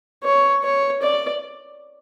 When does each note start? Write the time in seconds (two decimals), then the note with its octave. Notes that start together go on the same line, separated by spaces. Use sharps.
0.24 C#5
0.64 C#5
1.03 D5